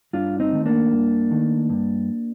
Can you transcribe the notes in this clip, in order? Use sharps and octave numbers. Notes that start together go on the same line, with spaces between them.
G2 D4 F4
C4 D#4
D#3 A3
A#3 D4
G2
D#3 A3
G2